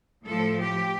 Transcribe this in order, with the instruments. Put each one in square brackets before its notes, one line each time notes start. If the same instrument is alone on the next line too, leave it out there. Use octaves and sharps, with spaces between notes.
[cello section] A2 F3 A4
G4